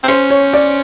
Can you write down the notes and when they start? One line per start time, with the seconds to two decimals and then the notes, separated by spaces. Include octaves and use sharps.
0.03 C4
0.08 C#4 C5
0.30 C#5
0.53 D5